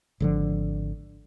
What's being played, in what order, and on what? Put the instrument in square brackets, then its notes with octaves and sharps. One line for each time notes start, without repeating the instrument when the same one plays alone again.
[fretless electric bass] G#1 D3 F3